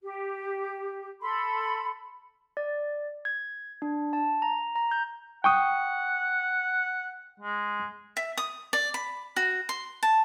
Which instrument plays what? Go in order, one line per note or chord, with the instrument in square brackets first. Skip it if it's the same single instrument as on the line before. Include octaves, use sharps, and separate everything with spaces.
[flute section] G4
A4 B5 C6
[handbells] D5
G#6
D4
A5
A#5
A#5
G6
[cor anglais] F#5 [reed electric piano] G5 C#6 D#6
[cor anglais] G#3
[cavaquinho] E5
D#6
D5
B5
F#4
C6
A5